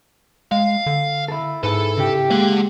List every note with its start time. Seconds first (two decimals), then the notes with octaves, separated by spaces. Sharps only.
0.52 G#3 F5
0.86 D3
1.28 E4 A4
1.63 G#2 E4 G#4 A4 B4
1.97 C#3 E4 G4
2.31 G#3 A#3 D5 F#5